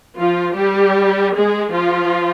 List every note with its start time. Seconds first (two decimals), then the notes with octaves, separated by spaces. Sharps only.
0.17 F3 F4
0.56 G3 G4
1.35 G#3 G#4
1.74 F3 F4